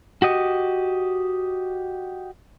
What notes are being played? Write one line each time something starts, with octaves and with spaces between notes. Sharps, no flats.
F#4 G4 D#5